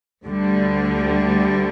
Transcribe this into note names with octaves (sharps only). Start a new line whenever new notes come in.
D2 D3 G3